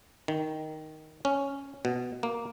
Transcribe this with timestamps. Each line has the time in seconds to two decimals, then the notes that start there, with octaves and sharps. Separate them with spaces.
0.28 D#3
1.25 C#4
1.85 B2
2.23 A#3